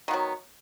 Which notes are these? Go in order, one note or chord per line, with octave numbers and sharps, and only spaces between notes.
D#3 F#3 B3